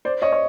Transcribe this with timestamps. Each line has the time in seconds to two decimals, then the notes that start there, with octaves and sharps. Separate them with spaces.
0.05 C5 D5
0.22 C#5 D#5
0.32 C#5